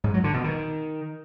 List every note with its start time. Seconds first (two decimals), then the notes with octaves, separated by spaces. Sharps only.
0.04 G#2
0.14 F#3
0.24 D3
0.34 B2
0.44 D#3